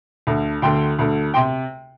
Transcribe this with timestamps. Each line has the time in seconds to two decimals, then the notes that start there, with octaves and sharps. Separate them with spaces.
0.27 D2 D3
0.62 D2 D3 G5 C6
0.99 D2 D3
1.34 C3 G5 C6